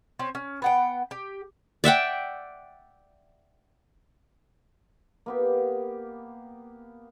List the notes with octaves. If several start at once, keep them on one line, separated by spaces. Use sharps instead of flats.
C4 C#4
C#4
B3 F#5 G5
G4
D5 E5 F#5 G5
A#3 B3 G4